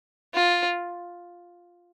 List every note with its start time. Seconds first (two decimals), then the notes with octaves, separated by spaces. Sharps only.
0.34 F4